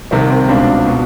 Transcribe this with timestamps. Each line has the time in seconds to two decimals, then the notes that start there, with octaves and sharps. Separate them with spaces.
0.11 C2 C3 D#3 C4
0.30 C4
0.49 C#2 B2 C4 D4
0.86 B2